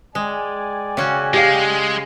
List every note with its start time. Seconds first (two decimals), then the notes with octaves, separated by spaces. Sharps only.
0.15 G#3 D5 G5 G#5
0.97 C#3 C#4 F#4
1.34 G#3 G4 F5